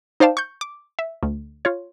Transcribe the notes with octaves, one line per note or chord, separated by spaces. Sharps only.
D#4 C5 D5 F5 G5 A5
C#6 G6
D6
E5
D2
F4 C#5